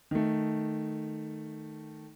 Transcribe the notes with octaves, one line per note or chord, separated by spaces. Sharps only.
D#3 A3